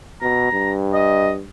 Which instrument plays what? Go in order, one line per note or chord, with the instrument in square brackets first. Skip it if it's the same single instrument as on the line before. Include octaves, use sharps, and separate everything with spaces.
[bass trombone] B2 [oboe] A#5
[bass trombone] G2
[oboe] D#5